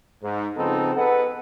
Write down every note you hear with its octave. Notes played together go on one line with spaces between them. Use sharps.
G#2
C#3 F3 B3 C4 D#4 A4
B3 G#4 A4 B4 D#5 F#5